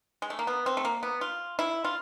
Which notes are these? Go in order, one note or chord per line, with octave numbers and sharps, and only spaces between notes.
G#3
A3
A#3
B3
C4
A3
A#3
B3
F4
E4
F4